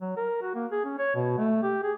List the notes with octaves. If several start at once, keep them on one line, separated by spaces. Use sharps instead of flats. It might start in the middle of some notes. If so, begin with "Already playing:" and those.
F#3
A#4
F#4
A#3
G#4
C#4
C#5
B2
A3
G4
G#4